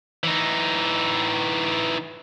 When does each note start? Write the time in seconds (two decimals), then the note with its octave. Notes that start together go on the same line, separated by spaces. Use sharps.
0.24 E3 D#4